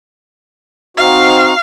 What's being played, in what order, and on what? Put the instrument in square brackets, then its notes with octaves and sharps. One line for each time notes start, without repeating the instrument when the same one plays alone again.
[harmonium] C4 D#4 F#4 [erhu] F5